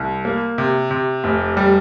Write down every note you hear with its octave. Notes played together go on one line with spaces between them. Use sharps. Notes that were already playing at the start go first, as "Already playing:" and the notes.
Already playing: C2
A#3
C3
C3
F1
G3